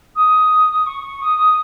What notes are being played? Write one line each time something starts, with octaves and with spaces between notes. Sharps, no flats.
D#6
C#6
D#6